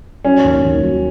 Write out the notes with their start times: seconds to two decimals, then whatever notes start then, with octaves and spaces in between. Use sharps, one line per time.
0.25 F#3 C#4
0.44 D#2
0.65 D#2
0.83 F#3